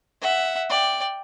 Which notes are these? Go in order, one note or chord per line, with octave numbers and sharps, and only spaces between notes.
E5 F#5
D5 G5